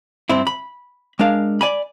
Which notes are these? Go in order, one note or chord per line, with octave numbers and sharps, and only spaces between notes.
G2 C4 E4
B5
G#3 D4 A#4 F5
D5 G#5 B5